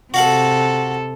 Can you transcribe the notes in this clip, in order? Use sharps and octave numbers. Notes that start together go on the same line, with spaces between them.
C3 F#4 A4 F5 F#5